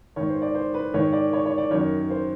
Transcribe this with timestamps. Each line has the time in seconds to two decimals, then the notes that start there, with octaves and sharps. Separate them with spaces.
0.16 G#2 D#3 C#5
0.30 C5
0.42 D5
0.55 C5
0.74 B4
0.94 G#2 D#3 C#5
1.13 D5
1.33 C#5
1.45 C#5
1.58 D5
1.71 F#2 D#3 C#5
2.10 C5